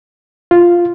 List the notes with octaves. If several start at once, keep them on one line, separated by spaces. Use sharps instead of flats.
F4